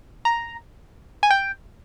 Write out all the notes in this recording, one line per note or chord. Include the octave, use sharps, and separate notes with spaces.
A#5
G#5
G5